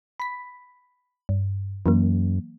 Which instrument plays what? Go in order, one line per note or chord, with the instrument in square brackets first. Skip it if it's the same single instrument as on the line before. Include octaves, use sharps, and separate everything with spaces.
[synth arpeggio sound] B5 B6
G2
[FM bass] F#2 [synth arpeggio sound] E3 F#3 A#3